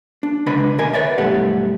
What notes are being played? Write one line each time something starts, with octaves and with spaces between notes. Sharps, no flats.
D4
C#2 D3 D4 B4 D#5 B5
D2 B2 A#4 D#5 G#5
B4 C#5 D5 E5
B1 G2 E3 A3 G4 F#5